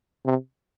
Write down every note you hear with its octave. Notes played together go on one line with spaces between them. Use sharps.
C3